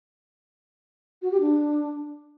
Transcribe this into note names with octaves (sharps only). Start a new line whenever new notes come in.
F#4
G4
D4